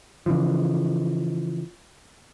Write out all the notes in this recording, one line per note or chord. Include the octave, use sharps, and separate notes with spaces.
C#3 E3 F3